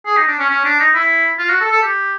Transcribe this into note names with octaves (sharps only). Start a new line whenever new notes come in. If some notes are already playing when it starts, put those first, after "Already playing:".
G#4
D#4
D4
C#4
C#4
D4
D#4
E4
F4
F#4
A4
A4
G4